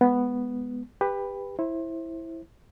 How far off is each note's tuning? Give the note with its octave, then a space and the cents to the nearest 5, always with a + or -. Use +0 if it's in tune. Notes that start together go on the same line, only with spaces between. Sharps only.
G#3 +0 B3 +0
G4 +20 B4 +0
E4 +0 C5 +30